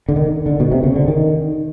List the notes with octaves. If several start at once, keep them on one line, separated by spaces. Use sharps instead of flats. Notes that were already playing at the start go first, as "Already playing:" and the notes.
D3
D#3
D3
B2
C3
C#3
D3
D#3